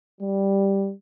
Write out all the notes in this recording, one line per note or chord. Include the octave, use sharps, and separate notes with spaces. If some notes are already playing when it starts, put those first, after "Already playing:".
G3